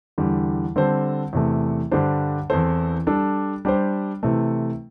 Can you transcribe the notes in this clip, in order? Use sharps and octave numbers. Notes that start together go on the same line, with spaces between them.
E2 D3 G3
D3 G3 C4 A4 C5
E2 C3 A3
G2 D3 G3 D4 C5
E2 E3 C4 A4 C5
G3 D4 A4
G3 D4 G4 C5
C3 E3 A3